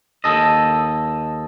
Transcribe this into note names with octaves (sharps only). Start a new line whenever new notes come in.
D#2 A4 D#5